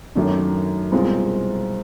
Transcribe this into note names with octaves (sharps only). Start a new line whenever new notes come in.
F#2 D#3 F#3 A3 D4
C2 B2 G#3 C4 F4